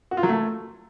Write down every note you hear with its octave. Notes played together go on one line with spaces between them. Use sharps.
F#4
F4
F#3
A3